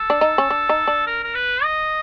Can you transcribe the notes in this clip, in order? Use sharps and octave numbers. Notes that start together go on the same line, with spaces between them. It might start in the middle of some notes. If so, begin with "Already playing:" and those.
Already playing: A4
D4
D#4
C#4
D4
D#4
D4
A#4
A#4
B4
D#5